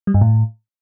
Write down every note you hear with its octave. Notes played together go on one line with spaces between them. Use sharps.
G3
G2
A2